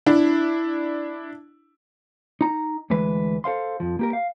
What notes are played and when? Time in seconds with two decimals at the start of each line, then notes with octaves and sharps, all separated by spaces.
0.06 D4 E4
2.41 D#4 A#5
2.90 D2 E3 G#3 B4
3.44 A4 C5 F5 C6
3.80 F2 F3
3.99 A#3 G4 A#4
4.13 F5